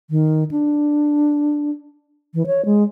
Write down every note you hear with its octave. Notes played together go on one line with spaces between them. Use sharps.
D#3
D4
E3
C#5
G#3